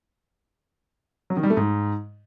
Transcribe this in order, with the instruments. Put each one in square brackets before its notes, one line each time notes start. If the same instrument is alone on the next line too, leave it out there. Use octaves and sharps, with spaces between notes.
[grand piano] F#3
D#3
G3
A3
G#2